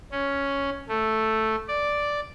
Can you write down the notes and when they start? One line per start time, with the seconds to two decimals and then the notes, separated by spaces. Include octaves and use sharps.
0.12 C#4
0.89 A3
1.68 D5